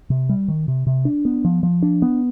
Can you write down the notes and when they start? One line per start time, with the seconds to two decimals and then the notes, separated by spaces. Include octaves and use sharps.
0.10 C3
0.29 G3
0.48 D#3
0.68 C3
0.87 C3
1.05 D4
1.25 B3
1.45 F3
1.63 F3
1.83 D4
2.02 B3